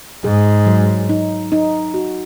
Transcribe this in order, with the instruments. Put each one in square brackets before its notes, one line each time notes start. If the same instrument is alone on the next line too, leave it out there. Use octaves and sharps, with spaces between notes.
[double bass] G#2 [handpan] G#4
[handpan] F#3
D#4
D#4
F#4